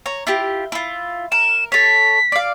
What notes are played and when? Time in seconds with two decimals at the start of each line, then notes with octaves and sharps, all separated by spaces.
0.06 C#5 A#5
0.27 E4 F4 G4
0.72 E4 F4
1.32 A#4 E7
1.72 A4 C#5 B6
2.32 D5 F5